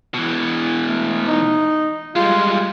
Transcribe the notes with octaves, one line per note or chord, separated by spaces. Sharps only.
B2 E3
A3
D#4
G3 G#3 F4